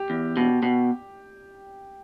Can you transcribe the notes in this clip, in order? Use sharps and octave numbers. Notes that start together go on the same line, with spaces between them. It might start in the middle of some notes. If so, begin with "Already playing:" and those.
Already playing: G4
E2
B2
B2